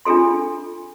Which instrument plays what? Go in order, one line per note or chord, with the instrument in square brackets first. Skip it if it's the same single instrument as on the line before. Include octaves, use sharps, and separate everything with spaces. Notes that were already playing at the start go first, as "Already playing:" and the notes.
[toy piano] D4 F4 G#4 A4 C6